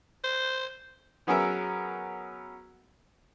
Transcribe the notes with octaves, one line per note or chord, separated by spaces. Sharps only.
C5
F#3 B3 C#4 G#4 A#4 E5